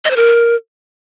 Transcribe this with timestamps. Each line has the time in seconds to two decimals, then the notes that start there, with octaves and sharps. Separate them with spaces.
0.05 D#5
0.11 C5
0.16 A#4